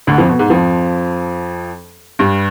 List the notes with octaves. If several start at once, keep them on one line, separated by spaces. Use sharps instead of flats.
D2 D3
F2 F3
B2
G#2
F2 F3
G2 G3